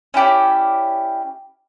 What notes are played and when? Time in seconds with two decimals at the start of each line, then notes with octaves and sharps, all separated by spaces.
0.14 C#4 E4 G4 D5